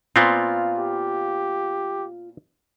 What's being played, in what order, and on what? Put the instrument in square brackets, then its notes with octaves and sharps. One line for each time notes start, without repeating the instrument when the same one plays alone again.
[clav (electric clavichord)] A#2 B3 C4 [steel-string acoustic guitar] F4 F5
[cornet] G4